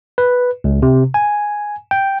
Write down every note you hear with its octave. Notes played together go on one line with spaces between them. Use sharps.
B4
C#2
C3
G#5
G5